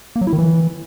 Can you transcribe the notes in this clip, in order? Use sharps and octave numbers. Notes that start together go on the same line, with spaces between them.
A#3
F#3
E4
D#3
E3